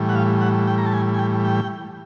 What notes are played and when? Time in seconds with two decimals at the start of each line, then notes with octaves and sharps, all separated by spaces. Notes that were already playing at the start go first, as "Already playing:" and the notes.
Already playing: A2 E3 G3
0.09 F#5
0.15 F5
0.41 F#5
0.67 G5
0.78 A#5
0.86 A5
0.94 G#5
1.14 G#5
1.19 G5
1.45 G5